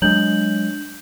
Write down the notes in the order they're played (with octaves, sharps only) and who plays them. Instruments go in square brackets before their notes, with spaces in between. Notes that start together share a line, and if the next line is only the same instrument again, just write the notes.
[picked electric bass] F#3 G#3 [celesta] D4 G6 F#7